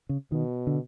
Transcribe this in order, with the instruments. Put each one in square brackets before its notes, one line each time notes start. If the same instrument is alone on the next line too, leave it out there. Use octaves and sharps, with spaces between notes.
[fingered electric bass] C#3
[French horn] B2 [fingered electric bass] D#3
[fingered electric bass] D3